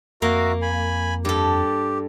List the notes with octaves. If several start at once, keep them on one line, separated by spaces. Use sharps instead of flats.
F2 A#3 F#4 A#4 E5
G#5 B5
G2 G4 A4